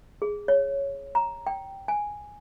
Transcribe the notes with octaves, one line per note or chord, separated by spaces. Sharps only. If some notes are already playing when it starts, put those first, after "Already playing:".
G#4
C#5
A#5
G5
G#5